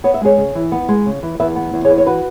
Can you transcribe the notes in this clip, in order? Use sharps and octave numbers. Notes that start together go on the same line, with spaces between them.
B3 C#5
E5
G#3 G#4 C#5
C#3
E3
B3
G#3
C#3
E3
E2 B4 E5
B3
E2
G#4 C#5
E3
C#5
F#4 B4